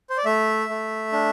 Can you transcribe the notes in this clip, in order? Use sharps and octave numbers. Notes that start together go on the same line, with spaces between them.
C5
D5
A3 E5
A3
D4